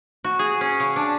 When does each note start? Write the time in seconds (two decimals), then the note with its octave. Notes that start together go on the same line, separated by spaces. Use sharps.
0.24 F#4
0.39 G#4
0.61 C#4
0.80 C#3
0.96 D4